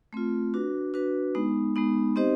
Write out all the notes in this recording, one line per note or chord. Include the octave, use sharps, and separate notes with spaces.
A3 C4 F4
D4 F#4 B4
D4 F#4 B4
G#3 B3 D#4
G#3 B3 D#4
C4 D#4 G4 C5 D#5